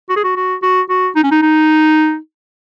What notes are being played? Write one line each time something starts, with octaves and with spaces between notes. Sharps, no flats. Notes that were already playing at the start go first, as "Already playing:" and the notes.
F#4
G#4
F#4
F#4
F#4
F#4
D#4
C#4
D#4
D#4